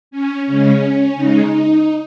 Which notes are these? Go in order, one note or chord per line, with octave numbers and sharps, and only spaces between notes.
C#4
C#3 G#3 C#4
C#3 G#3 D#4